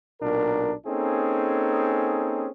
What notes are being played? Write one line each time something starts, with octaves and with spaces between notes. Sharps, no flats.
B1 A#2 D4 A#4
A#3 C4 C#4 D#4 G#4 A4